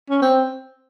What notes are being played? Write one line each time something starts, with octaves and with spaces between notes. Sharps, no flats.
C#4
C4